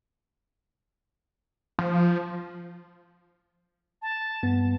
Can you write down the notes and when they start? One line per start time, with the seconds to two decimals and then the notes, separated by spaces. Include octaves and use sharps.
1.79 F3
4.02 A5
4.43 G2 B3